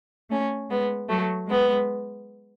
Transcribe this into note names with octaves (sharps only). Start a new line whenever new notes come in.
A3 C#4
G#3 B3
F#3 A3
G#3 B3